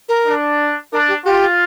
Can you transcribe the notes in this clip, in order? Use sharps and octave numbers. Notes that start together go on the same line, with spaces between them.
A#4
D4
D4 A#4
G4
F4 G4